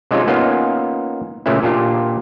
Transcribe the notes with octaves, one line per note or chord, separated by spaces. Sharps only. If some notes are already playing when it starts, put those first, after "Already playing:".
C3 G#3 C#4 D#4 F4
A#3 B3 C#4 D#4 F4
A#2 C#3 A3 C#4 E4
A#2 D4 F4 G4